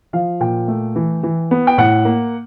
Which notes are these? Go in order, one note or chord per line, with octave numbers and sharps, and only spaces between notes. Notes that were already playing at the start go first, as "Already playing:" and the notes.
F3 F5
A#2 G5
A3
E3
E3
B3
G5
A2 F#5
A#3